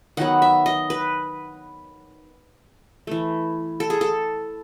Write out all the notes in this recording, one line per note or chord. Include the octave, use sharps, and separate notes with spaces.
D#3 F#3 B3 F#5
E5
D#5
B4
E3 A3
A4
G#4
A4